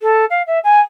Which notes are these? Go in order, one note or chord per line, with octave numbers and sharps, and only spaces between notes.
A4
F5
E5
G#5